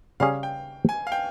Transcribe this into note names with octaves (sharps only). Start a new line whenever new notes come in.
C#3 G3 C#4 G#4 F5
G5
G#5
F5
G5